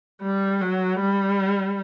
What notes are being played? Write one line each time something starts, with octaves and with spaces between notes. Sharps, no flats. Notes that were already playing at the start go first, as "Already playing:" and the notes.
G3
F#3
G3